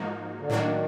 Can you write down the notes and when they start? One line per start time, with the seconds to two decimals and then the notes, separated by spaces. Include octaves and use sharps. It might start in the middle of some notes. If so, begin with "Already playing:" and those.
Already playing: G#2 F3 A#3 D#4 F#4
0.39 D3
0.49 A2 D#3 F#3 A#3 D4 F#4